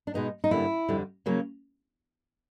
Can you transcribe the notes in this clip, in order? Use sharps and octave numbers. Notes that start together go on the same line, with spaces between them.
D4
B2 G#3 B3 D#4
D#4
G2 D3 G3 A#3 C#4 E4
F2 D3 G3
C#3 F#3 A#3 C#4